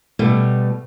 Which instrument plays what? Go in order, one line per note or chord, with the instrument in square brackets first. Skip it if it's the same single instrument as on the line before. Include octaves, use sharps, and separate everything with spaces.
[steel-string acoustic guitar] B2 G3 A3